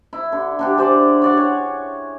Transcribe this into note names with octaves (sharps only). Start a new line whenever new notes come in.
E4
D3
D3 D4 G4
G#4 C5 D5
C#5 D5 F#5
C#5